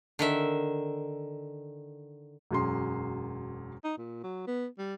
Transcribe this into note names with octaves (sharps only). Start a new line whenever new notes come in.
D3 D#3 E5
E1 F#2 C6
D#4
A#2
F#3
B3
G3